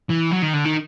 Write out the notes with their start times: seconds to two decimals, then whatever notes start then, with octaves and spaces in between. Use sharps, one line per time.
0.10 E3
0.32 F#3
0.42 D#3
0.53 D3
0.65 D#3